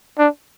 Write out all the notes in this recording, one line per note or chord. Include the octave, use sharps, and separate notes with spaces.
D4